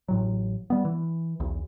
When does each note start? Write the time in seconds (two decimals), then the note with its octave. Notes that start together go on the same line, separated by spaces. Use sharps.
0.08 A1 A2 F#3
0.70 G3 B3
0.85 E3
1.40 B1 E2